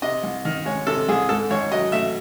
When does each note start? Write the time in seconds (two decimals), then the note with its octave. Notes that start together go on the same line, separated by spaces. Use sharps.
0.02 C3 D#5
0.23 C2
0.45 D#3
0.65 G#3 C#5
0.87 C3 A4
1.08 C2 G#4
1.29 G#2 A4
1.50 G#1 C#5
1.71 F#3 D#5
1.92 A3 E5